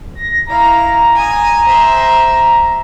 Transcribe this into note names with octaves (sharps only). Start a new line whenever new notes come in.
A#6
E4 F5 A#5
G#5 D#6
C5 E5